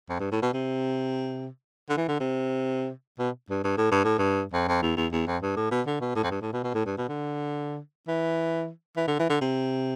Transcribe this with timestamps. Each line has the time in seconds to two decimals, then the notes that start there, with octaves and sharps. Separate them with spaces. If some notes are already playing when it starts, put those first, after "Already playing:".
0.09 F2
0.20 G2
0.31 A2
0.42 B2
0.54 C3
1.90 D3
1.97 E3
2.08 D3
2.20 C3
3.19 B2
3.50 G2
3.64 G2
3.78 A2
3.91 G2
4.04 A2
4.18 G2
4.53 F2
4.68 F2
4.82 E2
4.97 E2
5.12 E2
5.27 F2
5.42 G2
5.56 A2
5.71 B2
5.87 D3
6.01 B2
6.16 A2
6.24 F2
6.31 G2
6.42 A2
6.53 B2
6.64 B2
6.75 A2
6.86 G2
6.97 B2
7.09 D3
8.08 E3
8.96 E3
9.08 D3
9.19 E3
9.30 D3
9.41 C3